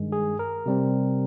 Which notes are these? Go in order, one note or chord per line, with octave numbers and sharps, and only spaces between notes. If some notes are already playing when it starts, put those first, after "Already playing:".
Already playing: G2 D#3 G#3
G#4
A#4
C3 G3 C4